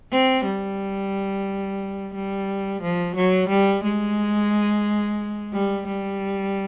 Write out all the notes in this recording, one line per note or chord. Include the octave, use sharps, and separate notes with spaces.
C4
G3
G3
F3
F#3
G3
G#3
G3
G3